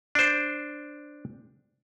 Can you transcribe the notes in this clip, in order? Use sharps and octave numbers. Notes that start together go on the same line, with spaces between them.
D4 C5